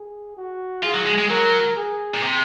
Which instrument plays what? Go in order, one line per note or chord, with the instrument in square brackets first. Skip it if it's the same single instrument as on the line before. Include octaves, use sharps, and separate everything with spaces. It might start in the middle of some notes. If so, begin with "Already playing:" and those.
Already playing: [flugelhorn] G#4
F#4
[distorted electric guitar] F4 [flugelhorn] G#4
[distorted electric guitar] F#3
G#3
G#3
[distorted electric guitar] F#3 [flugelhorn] A#4
[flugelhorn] G#4
[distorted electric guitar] A#2
C3